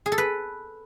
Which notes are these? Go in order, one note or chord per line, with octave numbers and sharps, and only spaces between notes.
G#4
A4
B4